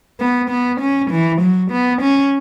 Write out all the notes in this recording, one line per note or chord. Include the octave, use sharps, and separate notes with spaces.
B3
B3
C#4
E3
F#3
B3
C#4